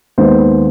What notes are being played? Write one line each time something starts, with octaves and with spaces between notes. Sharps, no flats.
D#2 D#3 G#3 B3 C5